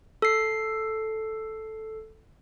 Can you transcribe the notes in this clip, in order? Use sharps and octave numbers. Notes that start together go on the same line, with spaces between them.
A4 C7